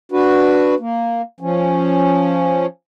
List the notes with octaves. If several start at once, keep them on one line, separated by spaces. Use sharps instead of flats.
D4 F#4 B4
A#3
F3 C#4